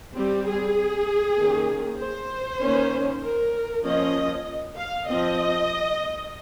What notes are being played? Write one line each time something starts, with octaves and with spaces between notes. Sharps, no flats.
G3 C4 G4
G#4
D#3 A#3 C#4
C5
D#3 A#3 C#4
A#4
F3 A#3 C#4 D#5
F5
F3 C4 D#5